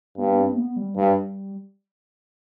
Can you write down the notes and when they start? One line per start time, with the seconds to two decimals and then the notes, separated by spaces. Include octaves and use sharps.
0.18 G2 B3
0.38 C4
0.53 A#3
0.57 B3
0.76 G3
0.96 G2 G3